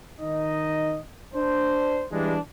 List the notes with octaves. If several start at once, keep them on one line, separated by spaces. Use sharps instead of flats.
D#3 D#4 D#5
D4 C5
E3 G3 G#3 D4